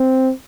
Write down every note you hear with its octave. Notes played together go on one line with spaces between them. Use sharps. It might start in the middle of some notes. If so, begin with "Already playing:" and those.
Already playing: C4